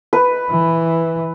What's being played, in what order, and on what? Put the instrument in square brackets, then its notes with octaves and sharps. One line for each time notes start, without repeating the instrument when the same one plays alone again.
[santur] B4
[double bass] E3